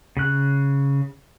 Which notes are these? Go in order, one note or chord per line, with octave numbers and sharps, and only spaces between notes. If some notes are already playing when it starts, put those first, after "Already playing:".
C#3 F#6